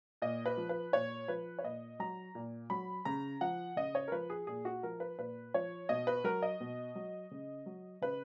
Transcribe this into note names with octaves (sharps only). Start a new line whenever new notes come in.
A#2 D#5
B4
F3
B4
A#2 C#5
F3 B4
C#5
A#2 D#5
F#3 A#5
A#2
F#3 B5
C#3 A#5
F3 F#5
C#3 D#5
C#5
A#4
F3 B4
G#4
A#2 G#4
F#4
F3 A#4
B4
A#2 B4
F3 C#5
B2 D#5
B4
F#3 A#4
D#5
B2
F#3
C#3
F#3
C#3 B4